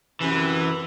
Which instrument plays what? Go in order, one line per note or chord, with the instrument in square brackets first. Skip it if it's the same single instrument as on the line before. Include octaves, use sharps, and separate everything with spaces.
[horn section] F#2 C3 [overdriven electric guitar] E3